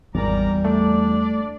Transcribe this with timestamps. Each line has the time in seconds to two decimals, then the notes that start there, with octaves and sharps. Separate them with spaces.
0.15 G#1 E2 G3 A#4 D5 A#5
0.65 A3 D4 D5